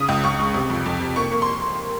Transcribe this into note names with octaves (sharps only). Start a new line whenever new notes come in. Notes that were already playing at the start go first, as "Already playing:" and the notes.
Already playing: C#3 D#6
C#2
C#2 C#6
G#3
C3
F2
F2
C3
A#3 C#6
A#3
C6